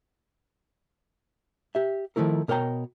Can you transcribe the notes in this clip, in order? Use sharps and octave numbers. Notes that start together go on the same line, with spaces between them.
G4 E5
D#3 F3 A3 E4 A#4
B2 A#4 C#5 G5 A#5